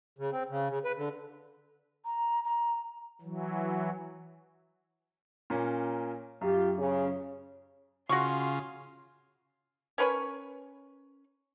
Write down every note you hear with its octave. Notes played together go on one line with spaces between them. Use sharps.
C#3
C4
C#3
C#3
B4
D3
A#5
A#5
E3 F#3
A#2 A#3 C#4
F#2 F4 G4
C#3
C#3 F4 F#4 C6 C#6
C#4 A#4 B4 C#5